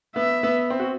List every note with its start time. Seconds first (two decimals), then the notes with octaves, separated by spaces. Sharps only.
0.16 B3 E5
0.43 B3
0.70 C4
0.80 F#4